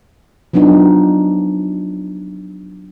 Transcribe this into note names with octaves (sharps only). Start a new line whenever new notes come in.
F3 F#3 B3 D4 D#4